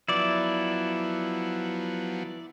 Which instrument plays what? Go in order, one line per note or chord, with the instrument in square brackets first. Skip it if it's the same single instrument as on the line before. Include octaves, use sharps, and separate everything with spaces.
[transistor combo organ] F3 F#3 B3 [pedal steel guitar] E4 D5